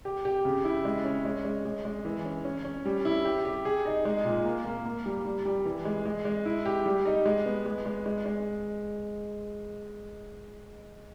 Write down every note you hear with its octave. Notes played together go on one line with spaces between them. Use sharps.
G4
G4
C#3
E4
G#3
C#4
G#3
G#3
G#3
G#3
E3
C#4
C#4
C#4
G3
E4
G4
G4
G#4
D#4
G#3
A#2
A#3
A#3
A#3
G3
G3
G3
E3
G#3
G#3
G#3
E4
G4
G3
D#4
G#3
B3
G#3
G#3
G#3
G#3